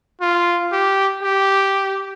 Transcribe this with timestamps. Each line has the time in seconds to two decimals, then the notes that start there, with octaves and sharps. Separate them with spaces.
0.21 F4
0.72 G4
1.23 G4